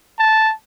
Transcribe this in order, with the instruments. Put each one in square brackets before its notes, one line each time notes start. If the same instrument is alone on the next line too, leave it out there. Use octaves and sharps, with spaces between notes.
[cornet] A5